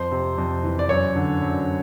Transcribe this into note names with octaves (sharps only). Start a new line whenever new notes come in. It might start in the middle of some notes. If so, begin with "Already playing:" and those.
Already playing: F2 C5
C3
F2
E3
D5
F#2 C#5
D3
F#2